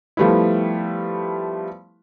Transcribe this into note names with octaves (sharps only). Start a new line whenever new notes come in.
F3 G3 A3 B3 E4